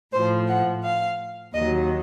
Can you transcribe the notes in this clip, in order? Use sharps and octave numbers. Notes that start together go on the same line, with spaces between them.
A2 F3 C5
F#5
F5
D#2 D#3 F#3 D#5